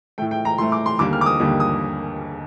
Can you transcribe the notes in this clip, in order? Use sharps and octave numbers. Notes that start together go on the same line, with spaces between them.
A2 A3 G5
G5
A#5
A2 A3 C6
D6
C6
D#2 D3 G3 A#3 D6
F6
D6
D#6
D#2 D3 G3 A#3
D#6